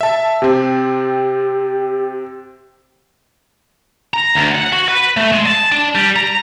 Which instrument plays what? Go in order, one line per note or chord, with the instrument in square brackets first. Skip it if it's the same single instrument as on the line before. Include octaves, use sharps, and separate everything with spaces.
[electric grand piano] E5 A5
[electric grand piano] C3 C4 [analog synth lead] G4
[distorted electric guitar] A#5
D2
F#5
F#4
B4
A3
G#3
A5
D4
G3
A#5